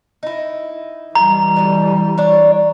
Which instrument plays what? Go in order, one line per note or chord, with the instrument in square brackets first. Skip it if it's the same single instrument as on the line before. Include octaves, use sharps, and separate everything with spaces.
[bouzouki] D#4 E4
[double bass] E3 G3 [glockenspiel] A#5
[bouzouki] B2 D3
D4 C#5